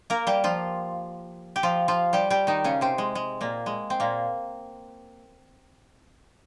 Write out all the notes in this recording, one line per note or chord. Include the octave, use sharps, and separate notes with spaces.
A#3 A#4
G3 G4
F3 F4
G4
F3 F4
F3 F4
G3 G4
G3 G4
D#3 D#4
C#3 C#4
C3 C4
G#3
G#3
A#2 A#3
G#3
C4
A#2 A#3